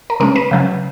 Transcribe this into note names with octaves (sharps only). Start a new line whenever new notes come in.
A#4
C#3 G#3 C#4 A#4
B4
C#3 F#3 C#4